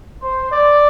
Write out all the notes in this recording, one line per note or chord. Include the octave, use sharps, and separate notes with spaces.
C5
D5